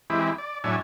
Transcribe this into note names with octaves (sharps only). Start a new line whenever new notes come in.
E3 G#3 C4 E4 G4
D5
A2 F#3 D4 C#5 E5 G#5